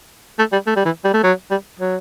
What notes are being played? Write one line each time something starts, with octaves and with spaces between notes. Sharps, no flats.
A3
G3
A3
G3
E3
G3
A3
F#3
G3
F#3